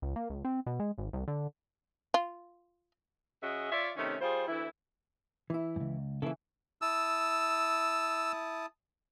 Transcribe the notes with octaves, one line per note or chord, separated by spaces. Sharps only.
C#2
A#3
C#2
C4
B2
G#3
G#1
C2
D3
F4
C#3 F#4 G#4 D#5 E5
F4 C#5 D5 E5
C3 D#3 A3 C#4
G3 F4 G#4 C5
D2 E3 E4
E3 E4
C#2 F#2
C#3 E3 A#3 E4 A4
E4 A5 D#6 E6